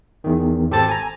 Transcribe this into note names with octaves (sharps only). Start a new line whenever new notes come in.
E2 D#3
G#1 G4 A4 C5 A5 A6
G#5 A#5